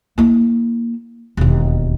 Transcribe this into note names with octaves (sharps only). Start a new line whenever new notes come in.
A#3 E4
E1 D#2